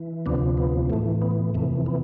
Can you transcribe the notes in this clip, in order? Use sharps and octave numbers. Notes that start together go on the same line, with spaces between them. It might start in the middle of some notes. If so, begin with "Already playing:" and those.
Already playing: E3
D2 C3 F3 B3 D4
B3
A2 E3 A3
B3
F2 C3 E3 A3
B3